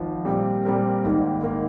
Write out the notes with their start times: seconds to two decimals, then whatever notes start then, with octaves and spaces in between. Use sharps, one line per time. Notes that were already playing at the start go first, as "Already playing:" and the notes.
Already playing: G#1 F3
0.25 A#2 G3 C4 G4 A#4
0.65 A#2 G3 C4 G4 A#4
1.04 G#1 G#2 D#3 A#3
1.43 G#1 G#2 D#3 A#3